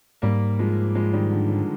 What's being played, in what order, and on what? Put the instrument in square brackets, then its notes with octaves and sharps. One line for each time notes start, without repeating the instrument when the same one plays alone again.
[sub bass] G#2 [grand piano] G3 A#3
[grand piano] F3 G#3
F3 G#3
D#3 G3
D3
D3